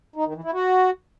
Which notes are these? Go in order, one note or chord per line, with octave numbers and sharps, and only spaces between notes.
D#4
D#3
E3
E4
F#4